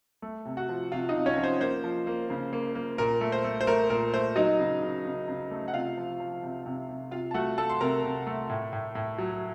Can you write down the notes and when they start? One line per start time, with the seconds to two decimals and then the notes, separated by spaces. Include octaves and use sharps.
0.22 A3
0.45 C3
0.57 F#4 F#5
0.69 F3
0.92 C3 F4 F5
1.09 D#4 D#5
1.15 C3
1.26 C#4 C#5
1.37 F3
1.44 C5
1.60 A#3 C5
1.84 F3
2.07 A#3
2.30 C#3
2.53 A#3
2.75 A#3
2.98 A#2 A#4
3.21 A3
3.32 C5
3.44 A3
3.61 C5
3.67 A3 A#4
3.90 A#2 A#4
4.13 A3 C5
4.36 F#3 D#4 D#5
4.59 C#3
4.82 C#3
5.05 C#3
5.28 C#3
5.51 A3
5.68 F#5
5.74 C3 F4 F5
5.97 F3
6.20 F3
6.43 C3
6.66 C3
6.89 C3
7.11 C3 F4 F5
7.31 A5
7.34 A3 F#4 F#5
7.58 A3 A4 A5
7.69 C6
7.81 C3 A#4 A#5
8.04 C3
8.27 A3
8.49 A2
8.73 A2
8.95 A2
9.18 F#3